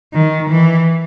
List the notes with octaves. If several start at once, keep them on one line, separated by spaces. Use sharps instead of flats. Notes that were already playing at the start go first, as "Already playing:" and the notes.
D#3
E3